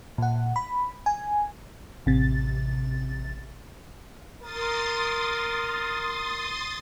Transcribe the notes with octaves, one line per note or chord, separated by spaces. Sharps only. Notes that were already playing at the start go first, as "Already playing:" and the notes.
A#2 F#5
B5
G#5
A1 C3 A6
A#4 C6 D#6 A6